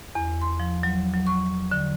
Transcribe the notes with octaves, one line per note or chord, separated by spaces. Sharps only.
E2
C6
F3
F#3
F#3
C#6
D3